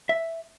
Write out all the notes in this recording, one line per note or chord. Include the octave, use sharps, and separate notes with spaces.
E5